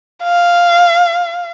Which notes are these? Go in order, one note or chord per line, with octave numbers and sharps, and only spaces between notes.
F5